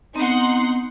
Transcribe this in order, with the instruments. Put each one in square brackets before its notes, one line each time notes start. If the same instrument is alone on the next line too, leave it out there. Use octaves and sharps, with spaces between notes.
[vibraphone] B3 C4 [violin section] D#4 F#5 C6